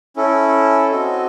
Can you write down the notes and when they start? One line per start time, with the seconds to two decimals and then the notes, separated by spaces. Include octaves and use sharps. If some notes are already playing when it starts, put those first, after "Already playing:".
0.16 C#4 E4 A4
0.91 C4 F#4 A4 D#5